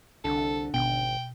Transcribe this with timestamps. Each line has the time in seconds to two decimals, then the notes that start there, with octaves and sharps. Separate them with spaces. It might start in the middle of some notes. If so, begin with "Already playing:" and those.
0.24 C2 D3 A4
0.74 G#1 B2 G5